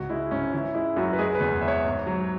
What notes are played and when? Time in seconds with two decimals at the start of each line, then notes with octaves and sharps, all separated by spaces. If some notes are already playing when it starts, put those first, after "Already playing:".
Already playing: C#2 G#2 F#4
0.10 G#3 E4
0.31 G#2 C#4
0.53 E3 E4
0.75 G#3 E4
0.96 F#2 F#4
1.13 B4
1.19 G#3 G#4
1.35 B4
1.40 E2
1.61 E2 E5
1.68 C#5
1.85 G#2
2.07 F#3